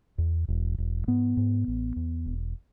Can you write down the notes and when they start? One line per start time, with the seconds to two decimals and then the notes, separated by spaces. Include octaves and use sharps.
0.18 E2
0.48 E1
0.78 E1
1.07 G#2 B3
1.37 G#2
1.68 A1
1.96 E2
2.26 E1